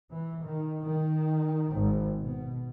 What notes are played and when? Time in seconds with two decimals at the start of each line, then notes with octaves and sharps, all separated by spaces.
0.11 E3
0.42 D#3
0.82 D#3
1.73 G#1
2.20 B2